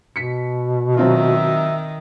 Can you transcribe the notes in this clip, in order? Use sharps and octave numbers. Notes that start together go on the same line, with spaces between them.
B2 B6 C#7
D#3 F#3 C4 F4 E5